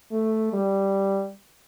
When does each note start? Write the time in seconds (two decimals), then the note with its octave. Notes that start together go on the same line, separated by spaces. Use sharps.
0.12 A3
0.53 G3